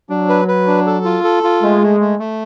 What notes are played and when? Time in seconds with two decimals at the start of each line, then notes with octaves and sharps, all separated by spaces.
0.09 F#3 D4
0.29 B4
0.48 B4
0.67 D4
0.86 A4
1.05 F4
1.24 A4
1.43 F4
1.62 G#3 A3
1.82 A3
2.01 A3
2.19 A3